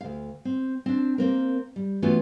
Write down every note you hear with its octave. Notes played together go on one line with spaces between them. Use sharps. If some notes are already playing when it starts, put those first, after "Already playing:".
D2 F5
C4
C4 D4
A#3 C4 A#4
G3
E3 A3 B3 C#4 F4 F#4